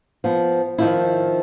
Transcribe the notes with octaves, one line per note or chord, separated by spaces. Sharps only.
F3 B3
D#3 F3 E4